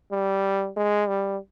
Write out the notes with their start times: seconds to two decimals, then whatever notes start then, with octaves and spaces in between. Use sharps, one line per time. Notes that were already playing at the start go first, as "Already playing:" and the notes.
0.12 G3
0.76 G#3
1.08 G3